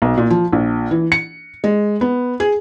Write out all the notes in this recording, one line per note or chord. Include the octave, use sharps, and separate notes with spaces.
B1
A#2
F3
A#1
E3
C#7
G#3
B3
G#4